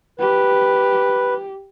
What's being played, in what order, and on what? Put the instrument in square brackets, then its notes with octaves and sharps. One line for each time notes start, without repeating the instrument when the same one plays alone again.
[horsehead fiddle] G4 [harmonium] B4